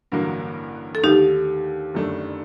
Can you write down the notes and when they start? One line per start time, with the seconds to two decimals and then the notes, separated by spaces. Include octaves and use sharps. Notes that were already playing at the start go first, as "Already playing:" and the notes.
0.12 A1 G2 D3 F#3 A#3
0.95 A4
1.03 D#2 D3 A3 D#4 G4
1.94 G1 F#2 D#3 A3 D4